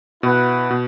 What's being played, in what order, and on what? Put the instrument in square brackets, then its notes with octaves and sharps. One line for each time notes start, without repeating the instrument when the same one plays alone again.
[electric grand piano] B2 [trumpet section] E4 B4 F#5
[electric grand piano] B2